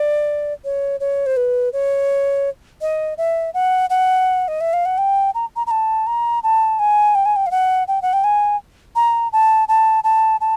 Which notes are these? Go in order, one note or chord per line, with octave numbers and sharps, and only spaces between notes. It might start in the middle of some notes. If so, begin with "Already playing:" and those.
Already playing: D5
C#5
C#5
C5
B4
C#5
D#5
E5
F#5
F#5
D#5
E5
F5
F#5
G5
A#5
A#5
A#5
A5
A#5
A5
G#5
G5
G#5
G5
F5
F#5
G5
F#5
G5
G#5
A#5
A5
A5
A5
A5